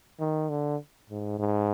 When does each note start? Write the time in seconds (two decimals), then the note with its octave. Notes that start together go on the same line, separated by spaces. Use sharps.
0.20 D#3
0.50 D3
1.10 G#2
1.39 G#2